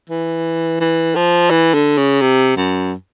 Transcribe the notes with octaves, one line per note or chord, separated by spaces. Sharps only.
E3
E3
F3
E3
D3
C#3
C3
F#2